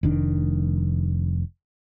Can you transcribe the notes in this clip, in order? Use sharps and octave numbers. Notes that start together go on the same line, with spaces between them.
F1 D#3 D4